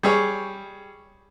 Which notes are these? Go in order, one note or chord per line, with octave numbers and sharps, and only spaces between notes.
G3 G#4 C#5